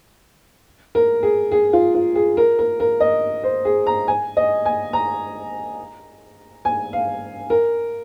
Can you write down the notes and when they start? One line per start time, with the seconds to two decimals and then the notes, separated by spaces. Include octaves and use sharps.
0.95 A#4
1.23 G#4
1.52 G#4
1.73 F4
1.95 F4
2.16 G#4
2.37 A#4
2.59 A#4
2.80 A#4
3.00 D#5
3.44 C5
3.65 G#4
3.87 A#5
4.08 G#5
4.37 D#5
4.66 G#5
4.93 A#5
6.65 G#5
6.93 F5
7.50 A#4